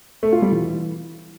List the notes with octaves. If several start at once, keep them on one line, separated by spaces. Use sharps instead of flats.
A3
F4
G3
E3